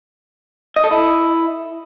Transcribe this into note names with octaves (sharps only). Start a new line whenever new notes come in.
D#5
A4
E4